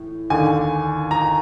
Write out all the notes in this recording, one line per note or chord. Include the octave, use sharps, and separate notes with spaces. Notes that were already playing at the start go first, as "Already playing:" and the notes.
Already playing: A2 E3
D#2 D3 G#5
A#5